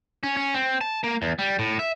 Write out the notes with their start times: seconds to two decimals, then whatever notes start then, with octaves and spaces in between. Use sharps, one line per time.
0.23 C#4
0.37 C#4
0.54 C4
0.81 A5
1.04 A#3
1.22 E2
1.39 G3
1.59 A2
1.79 E5